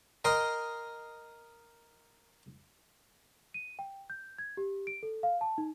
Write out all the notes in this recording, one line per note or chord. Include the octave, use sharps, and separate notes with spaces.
A#4 D#5 G5 C6
D#7
G5
G6
G#6
G4
D7
A4
F5
A5
D#4